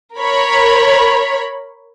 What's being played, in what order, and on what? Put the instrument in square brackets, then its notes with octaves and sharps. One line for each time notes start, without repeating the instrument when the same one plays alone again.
[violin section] A#4 C#5 B5